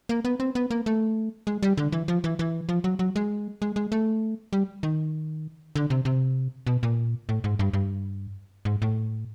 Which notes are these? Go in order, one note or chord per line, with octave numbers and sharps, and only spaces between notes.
A#3
B3
C4
B3
A#3
A3
G#3
G3
D3
E3
F3
E3
E3
F3
F#3
F#3
G#3
G#3
G#3
A3
G3
D#3
D3
C3
C3
B2
A#2
A2
G#2
G2
G2
G#2
A2